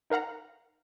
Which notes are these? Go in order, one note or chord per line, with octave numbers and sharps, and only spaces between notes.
D#4 A#4 F5 F#5 A#5